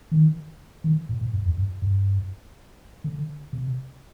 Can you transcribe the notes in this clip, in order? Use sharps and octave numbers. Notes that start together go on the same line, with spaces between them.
D#3
D#3
A2
A2
G2
F2
G2
G2
D3
C3